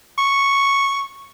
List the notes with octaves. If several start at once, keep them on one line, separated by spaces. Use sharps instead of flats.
C#6